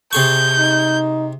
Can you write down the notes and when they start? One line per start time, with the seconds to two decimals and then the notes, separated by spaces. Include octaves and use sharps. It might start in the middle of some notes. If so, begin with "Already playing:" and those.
0.13 C3 G#4 C#6 G6
0.59 D#4